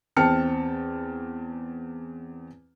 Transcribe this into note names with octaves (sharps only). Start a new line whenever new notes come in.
E2 C4 G5 A5 F6 C#7